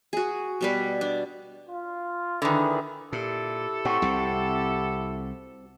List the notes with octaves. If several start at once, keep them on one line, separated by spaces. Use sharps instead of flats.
F#4 G#4
B2 G3 B4
D4
F4
D3 D#3 E4 G#4 B4
A#2 E4 G4 A4
A2 C4 F#4
C2 C3